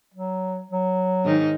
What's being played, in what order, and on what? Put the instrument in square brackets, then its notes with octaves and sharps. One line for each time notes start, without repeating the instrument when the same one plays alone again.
[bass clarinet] F#3
F#3
[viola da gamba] G#2 D#3 D#4